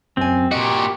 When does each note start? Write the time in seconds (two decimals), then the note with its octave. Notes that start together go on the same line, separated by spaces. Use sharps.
0.17 F#2 C4 G#5
0.51 A#2 F#4 G4 D#5